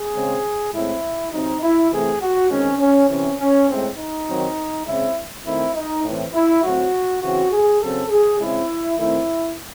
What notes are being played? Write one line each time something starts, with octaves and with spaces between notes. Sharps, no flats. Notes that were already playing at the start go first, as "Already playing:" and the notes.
Already playing: G#4
C#3 G#3 C4
A2 G#3 C4 E4
C3 F#3 C4 D#4
E4
C3 E3 A3 C4 G#4
F#4
D#3 G#3 C4 C#4
C#4
C3 E3 C4 C#4
C#4
A2 G#3 C4
D#4
D#3 F#3 C4
C#3 G#3 C4 E4
D#3 A3 C4 E4
D#4
A2 E3 C4
E4
A2 F#3 C4 F#4
C#3 E3 C4 F#4
G#4
C#3 F#3 C4 A4
G#4
C#3 G#3 C4 E4
D#3 A3 C4 E4